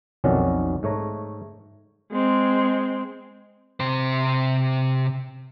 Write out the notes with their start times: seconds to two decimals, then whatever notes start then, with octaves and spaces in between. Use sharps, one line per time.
0.24 B1 F2 D#3 C#4 F#4 D5
0.83 G#2 A3 C#5 A#5
2.12 G#3 C4
3.80 C3 C5